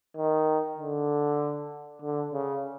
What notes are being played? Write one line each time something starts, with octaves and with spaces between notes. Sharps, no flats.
D#3
D3
D3
C#3